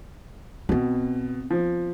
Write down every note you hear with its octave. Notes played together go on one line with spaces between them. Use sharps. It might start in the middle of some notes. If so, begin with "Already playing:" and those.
B2 B3 C4
F3